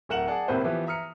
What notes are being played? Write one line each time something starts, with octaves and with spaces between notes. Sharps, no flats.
D1 A3 A#4 F#5 E7 F#7
G#4 D5 F#5 A5
G#1 A2 C3 A#3 B4 C5
E3 F3 B3 G4 B4
E5 A#5 D#6 F6 C#7